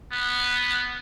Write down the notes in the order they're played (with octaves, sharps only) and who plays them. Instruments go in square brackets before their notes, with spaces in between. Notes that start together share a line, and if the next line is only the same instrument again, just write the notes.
[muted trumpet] B3